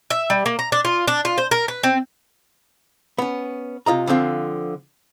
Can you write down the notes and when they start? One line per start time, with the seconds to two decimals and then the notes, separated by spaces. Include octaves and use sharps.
0.10 E5
0.30 G3
0.46 A#3
0.59 A#5
0.72 D4
0.85 F4
1.08 D4
1.25 F4
1.38 C5
1.51 A#4
1.68 B4
1.83 C4
3.18 B3 C#4
3.86 C3 F4 D#5 A#5
4.07 D3 F3 C4 F4